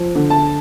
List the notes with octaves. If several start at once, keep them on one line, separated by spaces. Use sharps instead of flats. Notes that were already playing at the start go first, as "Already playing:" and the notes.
Already playing: F3
D3
A5